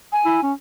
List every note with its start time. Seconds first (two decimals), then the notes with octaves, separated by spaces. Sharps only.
0.13 G#5
0.25 E4
0.43 C#4